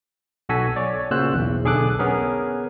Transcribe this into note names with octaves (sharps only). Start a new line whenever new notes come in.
B1 F#4 A4 G#5 B6
C#5 D5
A#2 C#3 F#4 C5 E6 F#6
B1 E2
B1 D3 G#4 A4 D6 F#6
B3 C#4 G#4 A#4